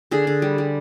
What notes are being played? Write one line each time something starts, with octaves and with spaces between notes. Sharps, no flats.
D3 G#4
D3
G3
G3